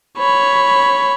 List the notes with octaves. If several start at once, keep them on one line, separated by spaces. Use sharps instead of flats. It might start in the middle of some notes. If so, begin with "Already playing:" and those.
C#5 B5